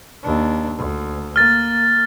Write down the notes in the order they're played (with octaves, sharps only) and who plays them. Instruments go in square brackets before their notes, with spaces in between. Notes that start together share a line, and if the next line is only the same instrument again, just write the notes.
[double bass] D#2 D4
D2
[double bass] A#3 [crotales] F6 A6